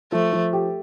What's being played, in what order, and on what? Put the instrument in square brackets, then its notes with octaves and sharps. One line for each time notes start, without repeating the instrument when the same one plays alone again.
[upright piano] F3 [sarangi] A3
[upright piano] F3
G4